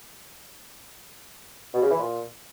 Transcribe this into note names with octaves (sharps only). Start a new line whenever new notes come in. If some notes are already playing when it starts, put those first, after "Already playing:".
B2
C#3
E3
A#2